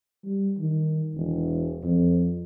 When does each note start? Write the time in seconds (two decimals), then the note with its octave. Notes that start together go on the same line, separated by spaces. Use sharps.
0.24 G3
0.58 D#3
1.15 E1
1.84 F2